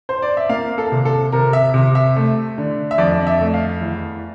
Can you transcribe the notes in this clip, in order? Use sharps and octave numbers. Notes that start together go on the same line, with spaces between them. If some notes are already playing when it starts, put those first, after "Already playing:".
C5
D5
E5
A#3 F5
A4
C3
A4
C3 A#4
E5
C3
E5
A3
D3
E5
F2 D5
E5
A3
F5
E2